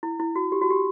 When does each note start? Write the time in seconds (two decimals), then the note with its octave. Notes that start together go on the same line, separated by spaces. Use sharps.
0.03 E4
0.19 E4
0.35 F#4
0.52 G4
0.62 F#4
0.70 G4